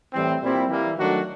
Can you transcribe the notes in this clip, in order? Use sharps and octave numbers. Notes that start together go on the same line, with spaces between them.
A2 E3 G3 C4
A#2 G3 C4 E4 G4
E3 G3 A#3
D#3 F#3 A3 D4 F#4